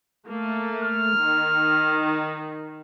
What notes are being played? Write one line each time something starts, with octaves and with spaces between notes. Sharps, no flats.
A3 A#3
F6
D#3